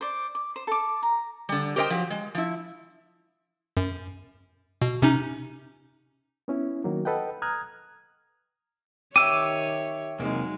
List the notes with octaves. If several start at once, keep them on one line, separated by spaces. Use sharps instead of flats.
C5 D5
D6
C5
A4 D6
A#5
D3 G3
G4 A#4 C5 C#5 D#5 G5
F3 F#3
G#3
F3 E4
F#2
B2
C3 C#4 D#4
B3 C#4 E4
D#3 F#3 A#3
A4 B4 D#5 F#5 G5
A#5 D#6 F6 F#6 G#6
D#3 G4 C#5 E5 G5 D6 E6 D#7
E2 C3 F#3 G#3 A#3 D#4